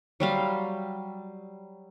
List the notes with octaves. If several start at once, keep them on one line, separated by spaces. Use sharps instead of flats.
F#3 G3 F5 C6